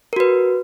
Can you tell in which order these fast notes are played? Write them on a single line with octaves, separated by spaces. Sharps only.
A#4 F#4 B4